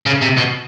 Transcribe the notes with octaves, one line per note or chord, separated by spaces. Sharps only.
C#3
C3
B2